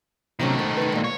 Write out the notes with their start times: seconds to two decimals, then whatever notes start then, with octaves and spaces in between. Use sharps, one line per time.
0.40 C3 D#3 F#3 A3 C#4
0.59 G#2
0.77 D#4 B4
0.92 A#2 G#3
1.04 C#5